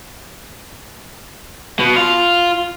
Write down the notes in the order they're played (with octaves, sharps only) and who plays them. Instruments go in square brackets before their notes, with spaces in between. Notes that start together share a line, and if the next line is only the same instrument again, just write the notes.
[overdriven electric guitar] B2
F4